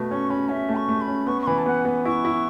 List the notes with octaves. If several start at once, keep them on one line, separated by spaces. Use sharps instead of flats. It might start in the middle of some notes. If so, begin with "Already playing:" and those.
Already playing: B2 A3
C#4 C#6
C#4 B5
C#4 E5
A3
C#6
A3
B5
C#4
B3 C#6
C#6
E3 B5
A5
B3 F#5
B3
E4 C#6
E4